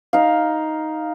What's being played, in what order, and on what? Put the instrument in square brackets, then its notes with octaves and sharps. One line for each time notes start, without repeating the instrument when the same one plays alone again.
[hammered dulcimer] D#4 F5